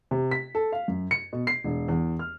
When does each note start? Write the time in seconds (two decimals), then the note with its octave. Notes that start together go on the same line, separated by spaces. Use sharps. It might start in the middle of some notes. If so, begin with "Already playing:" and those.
0.11 C3
0.31 B6
0.55 A4
0.72 F5
0.88 F#2
1.11 C#7
1.33 B2
1.47 C7
1.64 E1
1.88 E2
2.19 F6